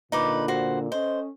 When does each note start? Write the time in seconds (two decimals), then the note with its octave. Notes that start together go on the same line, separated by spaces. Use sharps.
0.12 A#2 D3 D#4 B4 D6
0.48 F#4 C5
0.92 C#4 A4 C5 D#5